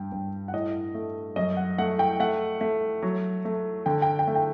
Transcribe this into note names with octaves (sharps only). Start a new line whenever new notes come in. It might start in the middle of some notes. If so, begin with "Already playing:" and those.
Already playing: G2 G5
G2
F#5
A2 D#5
A3
F#2 D#5
F#5
A3 F#5
G5
A3 F#5
A3
F#3
A3
D3 G5
G5
G5
A3
G5